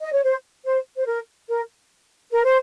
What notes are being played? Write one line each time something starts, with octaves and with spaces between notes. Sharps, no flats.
D#5
C#5
C5
C5
C5
A#4
A#4
A#4
C5